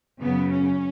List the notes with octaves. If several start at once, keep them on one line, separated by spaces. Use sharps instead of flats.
F#2 C#3 F#3 B3
C#4